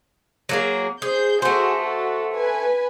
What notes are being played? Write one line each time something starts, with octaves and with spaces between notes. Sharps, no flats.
F#3 A#3 G#4
G#4 C5 G6
A3 F#4 G#4 C5
F#4 A4
B4 G#5